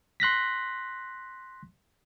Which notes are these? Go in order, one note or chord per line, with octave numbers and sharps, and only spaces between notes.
C6 F#6 A#6 B6